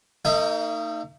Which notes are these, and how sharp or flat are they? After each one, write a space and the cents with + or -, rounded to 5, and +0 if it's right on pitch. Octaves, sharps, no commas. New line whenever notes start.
A#3 -45 D#4 +0 E5 +30